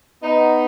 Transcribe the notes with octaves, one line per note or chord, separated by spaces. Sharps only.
B3 D#4